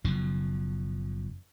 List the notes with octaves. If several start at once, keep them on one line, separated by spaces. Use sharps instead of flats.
F#1 F#2 B2 F3